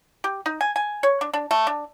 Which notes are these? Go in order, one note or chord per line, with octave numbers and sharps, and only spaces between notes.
G4
D#4
G#5
G#5
C#5
D4
D4
A3
D4